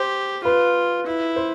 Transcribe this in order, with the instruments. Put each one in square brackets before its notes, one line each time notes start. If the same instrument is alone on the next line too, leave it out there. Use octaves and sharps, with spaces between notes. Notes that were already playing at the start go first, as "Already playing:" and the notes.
Already playing: [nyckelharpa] G4 [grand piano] C5
[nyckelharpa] F4 [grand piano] B4
[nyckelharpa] E4
[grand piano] C5